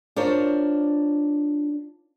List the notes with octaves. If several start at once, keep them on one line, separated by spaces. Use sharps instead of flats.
D4 F4 A#4 C5 C#5